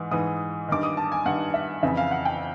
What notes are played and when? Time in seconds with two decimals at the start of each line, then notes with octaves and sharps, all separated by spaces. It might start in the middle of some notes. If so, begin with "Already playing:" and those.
Already playing: G#2 E3
0.11 G#2 E3 D#6
0.68 G2 D#3 D6
0.83 D#6
0.97 A5
1.12 G#5
1.26 G2 D#3 F#5
1.54 E5
1.83 F2 C#3 E3 E5
1.97 F5
2.11 F#5
2.25 G5